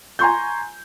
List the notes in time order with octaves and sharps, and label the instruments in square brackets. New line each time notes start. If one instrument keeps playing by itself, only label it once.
[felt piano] G#5 A#5 C6 C#6 G6